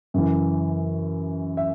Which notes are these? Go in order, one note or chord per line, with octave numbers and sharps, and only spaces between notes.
F#2 C#3 E3
E5